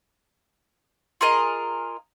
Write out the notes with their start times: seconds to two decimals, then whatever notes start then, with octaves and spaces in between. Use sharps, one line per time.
1.21 F4 G#4 A#4 D#5